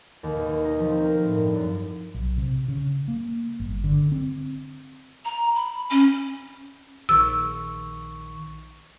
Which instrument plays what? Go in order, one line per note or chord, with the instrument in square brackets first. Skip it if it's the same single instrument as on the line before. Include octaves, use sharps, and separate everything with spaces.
[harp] D#2
B2
C#6
D#4
F3
C4
A#4
A2
G2
F#2
[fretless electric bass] B1
C3
C#3
A#3
G1
D3
C4
[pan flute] A#5
B5
C#4
[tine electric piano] A#1 D#3 C#6 [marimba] E6